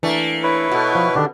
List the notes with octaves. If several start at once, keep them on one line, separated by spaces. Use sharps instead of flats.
E3 A3 A#3 D4
E4 B4 C#5
B2 F#4 A4
F3
D3 D#3 D4 G4 A4